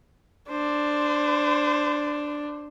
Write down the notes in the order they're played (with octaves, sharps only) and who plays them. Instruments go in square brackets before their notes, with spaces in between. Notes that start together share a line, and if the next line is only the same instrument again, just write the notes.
[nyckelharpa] D4 [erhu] C5